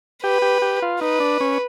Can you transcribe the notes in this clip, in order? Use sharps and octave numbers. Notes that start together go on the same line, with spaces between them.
G4 B4
G4
G4
F4
D#4 B4
D4
C#4